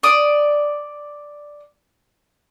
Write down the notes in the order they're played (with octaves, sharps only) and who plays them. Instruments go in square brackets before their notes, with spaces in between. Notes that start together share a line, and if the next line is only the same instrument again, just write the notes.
[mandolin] D5 D#6